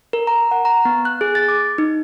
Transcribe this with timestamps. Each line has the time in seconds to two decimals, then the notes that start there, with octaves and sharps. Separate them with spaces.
0.13 A#4
0.27 A#5
0.51 F#5
0.65 A#5
0.85 B3
1.05 F#6
1.21 G#4
1.35 A6
1.48 D6
1.78 D#4